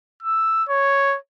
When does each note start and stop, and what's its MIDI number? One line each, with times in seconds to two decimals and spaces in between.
0.22 0.64 88
0.69 1.17 73